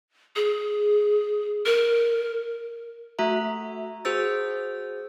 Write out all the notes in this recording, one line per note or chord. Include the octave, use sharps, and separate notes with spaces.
G#4
A#4
A3 F#4 E5 A#5
F#4 G#4 C5 E6 A6